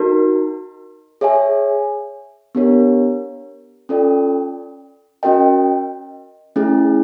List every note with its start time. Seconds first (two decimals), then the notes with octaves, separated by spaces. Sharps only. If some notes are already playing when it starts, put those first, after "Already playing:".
Already playing: D#4 F#4 A#4
1.21 G#4 C#5 E5 G#5
2.55 B3 D4 G4 A#4 C#5
3.89 C#4 F4 A4 D5 G5
5.23 C#4 F#4 A#4 D#5 G5
6.56 A3 C#4 E4 G#4